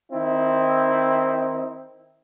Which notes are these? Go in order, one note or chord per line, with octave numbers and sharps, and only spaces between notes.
D#3 C4 D#4 E4